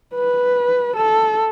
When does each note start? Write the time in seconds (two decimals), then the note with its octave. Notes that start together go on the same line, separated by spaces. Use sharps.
0.15 B4
0.96 A4